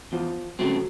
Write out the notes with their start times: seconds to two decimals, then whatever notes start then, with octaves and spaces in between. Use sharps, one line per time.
0.12 E2 F3
0.59 C#3 F3 F#3 A3 C4